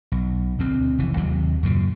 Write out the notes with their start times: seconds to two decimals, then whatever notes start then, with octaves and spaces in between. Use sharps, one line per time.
0.12 B1
0.59 D2 C4
0.98 F1 E3
1.17 D#2 C3 F#3
1.63 F#2 A#2 C#3